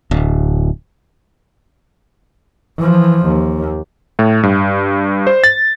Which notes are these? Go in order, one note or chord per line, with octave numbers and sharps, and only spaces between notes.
D1
E3 F3
D#2
A2
G2
C5
A6